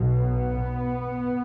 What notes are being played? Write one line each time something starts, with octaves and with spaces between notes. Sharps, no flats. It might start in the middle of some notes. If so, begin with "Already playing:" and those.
Already playing: B1 B2
B3